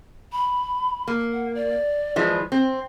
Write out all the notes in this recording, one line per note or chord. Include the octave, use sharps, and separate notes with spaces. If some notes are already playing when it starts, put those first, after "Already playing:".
B5
A#3
F#5
D5
E3 F3 G#3
C4